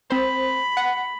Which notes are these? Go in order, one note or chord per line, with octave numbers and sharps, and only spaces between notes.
C4 C5 B5
F#5